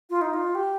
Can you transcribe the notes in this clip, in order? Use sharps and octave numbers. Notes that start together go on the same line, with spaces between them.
F4
D#4
F4
G4